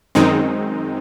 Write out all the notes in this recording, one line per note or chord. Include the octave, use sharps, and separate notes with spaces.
F#2 D#3 G#3 C4 D#4